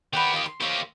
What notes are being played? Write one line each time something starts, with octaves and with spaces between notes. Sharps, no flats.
D#3 G4 B4 F#5 G5
F4 D#5
C6
A#3 G4 C5 C#5 E5